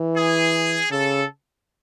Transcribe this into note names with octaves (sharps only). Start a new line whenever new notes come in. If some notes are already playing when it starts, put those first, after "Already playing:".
Already playing: E3
G#4
C#3 A4